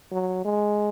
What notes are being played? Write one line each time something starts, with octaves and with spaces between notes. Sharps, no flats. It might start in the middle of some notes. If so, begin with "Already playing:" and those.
F#3
G#3